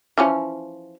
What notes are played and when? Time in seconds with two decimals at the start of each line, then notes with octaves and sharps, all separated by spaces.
0.18 E3 F3 C#4